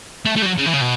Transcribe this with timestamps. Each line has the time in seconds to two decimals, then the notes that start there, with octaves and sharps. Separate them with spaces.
0.26 A3
0.36 A3
0.43 G3
0.46 F#3
0.58 C#3
0.66 E3
0.74 C#3
0.81 B2